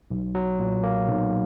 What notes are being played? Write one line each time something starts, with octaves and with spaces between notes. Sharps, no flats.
B1
F#3
A#2
A#3
B1